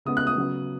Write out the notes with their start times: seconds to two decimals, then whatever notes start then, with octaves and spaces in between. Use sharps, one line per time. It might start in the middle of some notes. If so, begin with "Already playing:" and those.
0.05 C#3 G#3 B3 D#6
0.17 F#6
0.27 D#6
0.37 C#3 F#3 B3